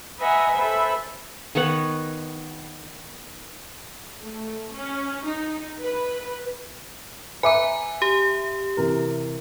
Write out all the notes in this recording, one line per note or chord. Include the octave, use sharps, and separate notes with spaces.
B4 D#5 E5 F#5 G#5 A#5
A4 B4 C5 E5 B5
D#3 B3 C#5 F#5
A3
C#4
D#4
B4
B4 E5 G#5 A#5 D6
G4
C3 E3 A#4